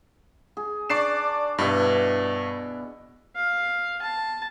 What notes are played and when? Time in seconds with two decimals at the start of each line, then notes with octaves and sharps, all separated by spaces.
0.57 G#4
0.90 D4 D5 C#6 C7 E7
1.58 G2 B2 E4
3.36 F5
4.02 A5